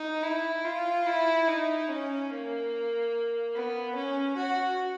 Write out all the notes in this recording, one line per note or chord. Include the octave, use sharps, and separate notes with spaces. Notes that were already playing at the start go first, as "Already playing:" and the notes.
Already playing: D#4
E4
F4
E4
D#4
C#4
A#3
B3
C#4
F#4